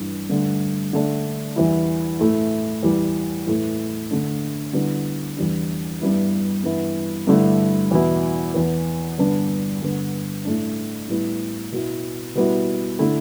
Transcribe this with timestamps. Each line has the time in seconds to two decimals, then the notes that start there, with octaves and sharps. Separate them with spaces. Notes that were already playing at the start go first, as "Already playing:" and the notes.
Already playing: G2 E3 G3 D4
0.29 G2 D3 A3
0.93 D3 A3 D4
1.56 E2 E3 G3 E4
2.19 A2 A3 E4
2.83 E2 E3 G3
3.47 A2 E3 A3
4.11 D3 A3 D4
4.73 D3 G3 B3 E4
5.37 E2 E3 G3 D4
6.01 G2 G3 B3 E4
6.64 G2 E3 B3 E4
7.27 G2 D3 A3 E4
7.91 E2 B2 B3 E4
8.54 E2 E3 B3
9.18 G2 D3 B3 D4
9.82 G2 D3 B3
10.45 A2 A3 D4
11.08 A2 G3 B3 E4
11.72 B2 B3 E4
12.35 B2 G3 B3 E4
12.99 D3 A3 E4